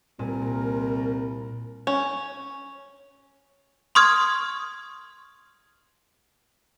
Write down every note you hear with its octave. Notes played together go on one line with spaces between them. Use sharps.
C2 A#2 A#4
C#4
C6 C#6 D#6 F6 G#6